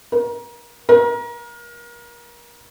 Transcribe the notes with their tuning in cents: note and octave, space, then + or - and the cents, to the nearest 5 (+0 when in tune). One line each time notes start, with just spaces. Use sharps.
A#4 +30
A#4 +30